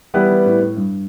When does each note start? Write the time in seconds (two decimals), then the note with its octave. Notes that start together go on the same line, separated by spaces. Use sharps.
0.14 E3 G3 B3 E4 G4 B4
0.30 E3
0.46 A2
0.61 A2
0.77 G2